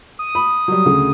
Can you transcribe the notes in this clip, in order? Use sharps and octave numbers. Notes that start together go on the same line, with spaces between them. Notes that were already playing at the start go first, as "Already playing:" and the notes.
D#6
B5
F#3 G3
D2 C#3